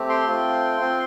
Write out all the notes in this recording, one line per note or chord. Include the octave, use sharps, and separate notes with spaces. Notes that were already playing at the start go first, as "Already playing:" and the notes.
Already playing: A3 C4 G4
G5 C6
A3 C4 F4
C4 F4